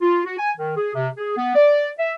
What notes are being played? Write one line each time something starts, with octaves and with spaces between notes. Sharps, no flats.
F4
F#4
G#5
D#3
G#4
C3
G#4
B3
D5
E5